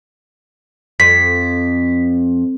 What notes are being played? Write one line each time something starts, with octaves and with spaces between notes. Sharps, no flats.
F2 B6